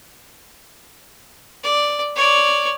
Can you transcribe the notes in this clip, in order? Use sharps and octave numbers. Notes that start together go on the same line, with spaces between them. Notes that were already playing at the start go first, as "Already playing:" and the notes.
D5
C#5 D5